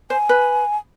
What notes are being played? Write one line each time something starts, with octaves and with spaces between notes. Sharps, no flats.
C5 G#5
B4